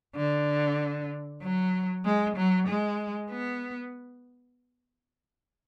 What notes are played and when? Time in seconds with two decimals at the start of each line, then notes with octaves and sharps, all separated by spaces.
0.16 D3
1.42 F#3
2.05 G#3
2.37 F#3
2.68 G#3
3.30 B3